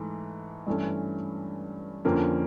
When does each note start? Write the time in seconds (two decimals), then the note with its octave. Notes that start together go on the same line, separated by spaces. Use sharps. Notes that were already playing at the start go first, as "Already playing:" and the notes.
Already playing: G#2 E3 A3
0.67 G2 E3 A3 C#4
2.05 F2 D3 F3 A#3 C#4